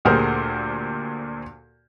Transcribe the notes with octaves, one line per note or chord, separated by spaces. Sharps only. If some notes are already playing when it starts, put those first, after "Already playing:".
D2 A#2 G4 G#4 A#4 C5